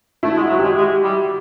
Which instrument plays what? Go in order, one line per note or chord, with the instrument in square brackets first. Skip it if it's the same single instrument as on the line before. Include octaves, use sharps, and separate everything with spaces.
[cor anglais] A3 [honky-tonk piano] E4
[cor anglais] G#3
[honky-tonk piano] F#4
[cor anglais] F#3
[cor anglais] G#3 [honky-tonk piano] G4
[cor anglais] G#3
G3